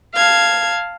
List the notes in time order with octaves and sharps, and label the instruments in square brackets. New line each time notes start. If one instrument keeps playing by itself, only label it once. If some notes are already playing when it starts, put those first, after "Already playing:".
[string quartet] F5 A5 G#6